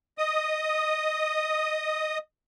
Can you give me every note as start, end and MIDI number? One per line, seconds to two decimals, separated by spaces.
0.18 2.18 75
0.18 2.18 87